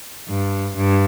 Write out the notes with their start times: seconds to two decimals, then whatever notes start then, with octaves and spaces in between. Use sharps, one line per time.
0.28 G2
0.77 G2